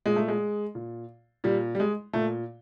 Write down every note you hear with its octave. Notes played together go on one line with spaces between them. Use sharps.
A#2 G#3
A3
G#3
A#2
A#2 G3
G3
G#3
A#2 A3